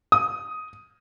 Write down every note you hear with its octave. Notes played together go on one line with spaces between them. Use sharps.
D#6